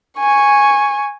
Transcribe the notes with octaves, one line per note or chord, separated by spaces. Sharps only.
G#5 C#6